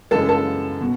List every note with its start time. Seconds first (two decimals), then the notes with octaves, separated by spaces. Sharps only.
0.11 F#2 C#3 E3 G#3 A4 A5
0.29 A4 A5
0.81 B2